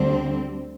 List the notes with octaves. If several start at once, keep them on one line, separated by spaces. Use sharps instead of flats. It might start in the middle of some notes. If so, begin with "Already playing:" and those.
Already playing: D2 D3 G3 C4